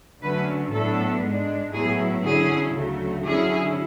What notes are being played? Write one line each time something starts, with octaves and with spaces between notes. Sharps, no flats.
D3 F#3 A3 C#4 B4
A2 F#3 B3 D4 A4
G#2 G#3 D4
A2 F#3 B3 E4 G#4
D3 F#3 C#4 E4 G#4
D2 C#3 F#3 A3
D3 F#3 C#4 E4 G#4